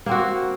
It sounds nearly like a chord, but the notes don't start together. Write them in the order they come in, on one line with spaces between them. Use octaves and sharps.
A#3 C4 F#4